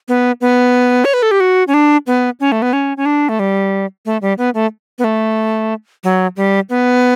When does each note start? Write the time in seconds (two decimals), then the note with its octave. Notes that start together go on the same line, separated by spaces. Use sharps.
0.08 B3
0.41 B3
1.05 C#5
1.14 B4
1.23 A4
1.31 G4
1.40 F#4
1.68 C#4
1.74 D4
2.07 B3
2.40 C#4
2.52 A3
2.62 B3
2.73 C#4
2.97 C#4
3.06 D4
3.29 A3
3.39 G3
4.06 A3
4.22 G3
4.38 B3
4.54 A3
4.99 B3
5.04 A3
6.04 F#3
6.37 G3
6.70 B3